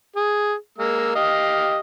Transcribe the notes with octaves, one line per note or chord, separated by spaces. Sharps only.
G#4
G#3 A#3 E6
G4 D#5 F5